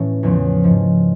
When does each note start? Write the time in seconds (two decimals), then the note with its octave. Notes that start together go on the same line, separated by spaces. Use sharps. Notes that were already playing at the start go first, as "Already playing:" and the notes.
Already playing: A2 E3 A3 C#4
0.23 E2 C#3 F3 A3
0.64 G#2 F3 A3